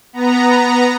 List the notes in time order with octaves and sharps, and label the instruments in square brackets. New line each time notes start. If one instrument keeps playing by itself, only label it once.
[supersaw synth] B3 A#5